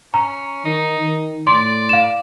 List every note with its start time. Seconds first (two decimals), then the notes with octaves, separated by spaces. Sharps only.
0.14 C#4 A#5
0.65 D#3 D#4
1.04 D#3
1.47 A2 D5 C6
1.89 F5 E7